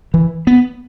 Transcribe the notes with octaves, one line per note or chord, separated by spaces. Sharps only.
E3
B3